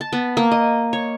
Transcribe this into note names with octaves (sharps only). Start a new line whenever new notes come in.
A5
B3
A#3
D#5
C#5